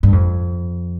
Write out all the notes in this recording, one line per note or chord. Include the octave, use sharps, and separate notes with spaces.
G2
F2